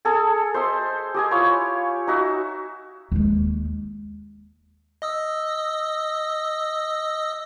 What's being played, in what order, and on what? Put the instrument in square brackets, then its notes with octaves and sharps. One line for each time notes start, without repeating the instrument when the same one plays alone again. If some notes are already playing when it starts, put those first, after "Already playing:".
[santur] G#4 A4 G#5
C5 D#5 E5 C6
G4 D#5 G#5
E4 F4 C#5
D#4 F#4 E5
[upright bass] D#2 G#3
[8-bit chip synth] D#5 D#6 E6